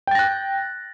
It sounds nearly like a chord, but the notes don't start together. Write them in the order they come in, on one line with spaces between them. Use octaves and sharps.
G5 A6 A#6 F#6